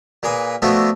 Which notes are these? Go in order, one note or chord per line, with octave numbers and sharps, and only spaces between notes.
A#2 A#3 G#4 B4
F3 A3 B3 D4 E4 F#4